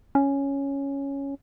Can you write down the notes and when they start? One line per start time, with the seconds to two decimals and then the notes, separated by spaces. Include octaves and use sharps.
0.15 C#4